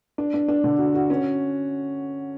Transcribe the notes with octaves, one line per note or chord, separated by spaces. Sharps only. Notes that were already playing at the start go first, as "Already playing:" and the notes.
D4
D4
D4
D3
F#4
F#4
C#4